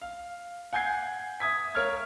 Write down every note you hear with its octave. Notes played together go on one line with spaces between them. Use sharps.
F5
F#5 G#5 G6 G#6 C7
E5 D#6 G#6 B6
A#4 C#5 E5 F5 F6 G#6